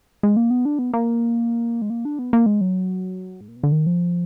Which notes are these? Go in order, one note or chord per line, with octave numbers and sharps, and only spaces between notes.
G#3
A#3
B3
D4
B3
A#3
G#3
A#3
D4
B3
A#3
G#3
F#3
G#2
A#2
B2
D3
D#3
F3